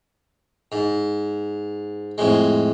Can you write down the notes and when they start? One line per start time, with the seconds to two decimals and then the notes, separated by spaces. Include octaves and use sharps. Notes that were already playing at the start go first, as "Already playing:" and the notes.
0.72 G#2
2.18 F2 A2 G#3